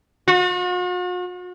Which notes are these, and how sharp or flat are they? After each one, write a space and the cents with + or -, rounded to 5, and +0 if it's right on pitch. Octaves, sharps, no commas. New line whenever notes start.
F#4 -45